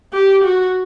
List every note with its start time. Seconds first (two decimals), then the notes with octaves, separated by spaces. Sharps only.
0.13 G4
0.44 F#4